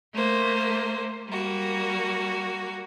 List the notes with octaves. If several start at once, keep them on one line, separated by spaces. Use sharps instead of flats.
A3 A#3 C5
G3 A#3 F#4